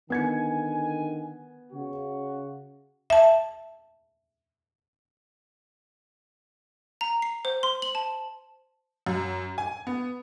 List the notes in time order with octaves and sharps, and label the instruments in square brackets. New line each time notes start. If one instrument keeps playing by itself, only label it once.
[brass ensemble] D3 D#3 G#5 [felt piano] B3 G#6 C#7
[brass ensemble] C#3 F#4
[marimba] E5 A5
[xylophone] A#5
C7
C5
C6
F#7
A5
[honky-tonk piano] F#2
G#5
B3